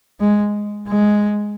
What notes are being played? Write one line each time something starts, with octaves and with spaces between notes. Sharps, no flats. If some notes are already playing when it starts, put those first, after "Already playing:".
G#3
G#3